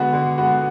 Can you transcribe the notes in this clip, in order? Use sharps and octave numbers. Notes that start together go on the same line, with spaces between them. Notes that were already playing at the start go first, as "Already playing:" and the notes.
Already playing: D3 G#3 B3 F#4
D3
G#3 B3 F#4